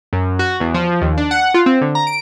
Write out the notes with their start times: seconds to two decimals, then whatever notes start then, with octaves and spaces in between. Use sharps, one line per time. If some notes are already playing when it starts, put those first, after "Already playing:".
0.13 F#2
0.39 F#4
0.60 E2
0.74 F3
1.02 D#2
1.18 D4
1.31 F#5
1.54 F4
1.66 C4
1.81 D3
1.95 A#5
2.07 D7